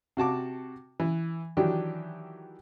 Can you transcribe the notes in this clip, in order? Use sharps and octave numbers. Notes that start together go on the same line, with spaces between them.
C3 F#4 A5 D6
E3
D#3 E3 F#3 D4 G4